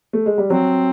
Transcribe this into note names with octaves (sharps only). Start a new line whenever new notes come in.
A3
G#3
G3
F#3 C4